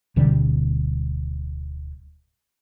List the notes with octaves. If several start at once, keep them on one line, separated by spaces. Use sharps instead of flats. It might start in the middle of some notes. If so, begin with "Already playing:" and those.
D1 B2 D3 G3